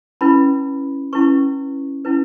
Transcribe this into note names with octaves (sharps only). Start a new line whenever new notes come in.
C#4 E4 B4 B5
C#4 E4 B4 C#6
C#4 E4 B4